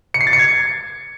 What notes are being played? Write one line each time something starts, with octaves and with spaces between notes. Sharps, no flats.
C#7
C7
A6
C#7
G#6